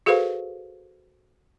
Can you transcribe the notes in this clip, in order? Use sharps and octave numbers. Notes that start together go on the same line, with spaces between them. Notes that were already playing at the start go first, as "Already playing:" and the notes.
F#4 G#4 A4 B4 C5 F5